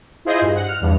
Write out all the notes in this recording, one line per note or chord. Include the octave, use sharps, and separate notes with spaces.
E4 F4 G#4 C5 D#5
G2
F#5
F6
E2 G2